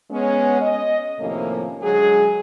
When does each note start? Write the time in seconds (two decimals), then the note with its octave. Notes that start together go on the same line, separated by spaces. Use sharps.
0.11 G#3 B3 C#4
0.61 D#5
1.20 D#2 A2 C3 F3 A#3 C#4
1.82 D3 F#3 G#3 G#4